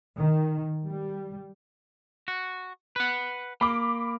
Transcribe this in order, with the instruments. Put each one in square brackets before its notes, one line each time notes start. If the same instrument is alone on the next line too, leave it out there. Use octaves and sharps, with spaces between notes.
[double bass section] D#3
G3
[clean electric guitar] F#4
B4 F#5
[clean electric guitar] A#3 [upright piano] B5 D6